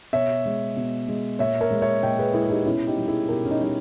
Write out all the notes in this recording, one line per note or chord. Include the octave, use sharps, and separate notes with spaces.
B2 C#5 E5
G#3
B2
G#3
A#2 C#5 E5
A#4 C#5
G#3
C#5 E5
A#2 D#5 G5
G#4 B4
G#3 E4 G#4
G#4
D#4 G4
B2 C#4 E4
D#4 G4
G3
E4 G#4
B2 G4 A#4
C#4
D#4
G3 D#4